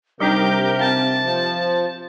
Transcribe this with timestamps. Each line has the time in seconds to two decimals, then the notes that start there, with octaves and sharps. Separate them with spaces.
0.20 C3 G3 D4 D#4 G4 A#4 D6 G6
0.79 C4 F5 A5
1.24 F3